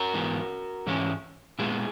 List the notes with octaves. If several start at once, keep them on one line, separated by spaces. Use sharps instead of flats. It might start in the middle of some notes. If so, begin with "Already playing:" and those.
Already playing: F#4 A#4
G#2 E3 B3
G#2 E3 G#3 C#4
A#2 G#3 B3 E4 G#4